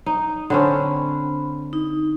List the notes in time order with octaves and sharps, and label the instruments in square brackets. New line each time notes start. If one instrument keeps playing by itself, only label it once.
[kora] D#4
[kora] D3 C4 C#4 [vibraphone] B5
[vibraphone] D#4